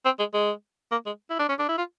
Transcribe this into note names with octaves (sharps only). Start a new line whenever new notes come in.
C4
G#3
G#3
A#3
G#3
E4
D4
C#4
D4
E4
F4